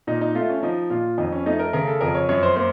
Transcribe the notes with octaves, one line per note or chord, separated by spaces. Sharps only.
A#2 D#4
D#4
A3 F4
C#4
F3 D#4
A#2 F4
F2 D#4
C#4
A3 D#4
A#4
C#3 A#4
A4
F2 A#4
C#5
F#2 C#5
C5
A#3 C5